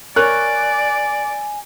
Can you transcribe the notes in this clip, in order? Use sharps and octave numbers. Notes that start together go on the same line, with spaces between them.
A#4 C#5 D5 G#5 F#6